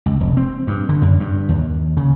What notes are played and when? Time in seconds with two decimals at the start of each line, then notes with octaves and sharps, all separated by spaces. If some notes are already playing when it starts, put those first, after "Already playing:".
0.06 C#2
0.20 F1
0.37 C4
0.67 G2
0.89 D3
1.02 F#2
1.20 G2
1.49 D#2
1.97 C#3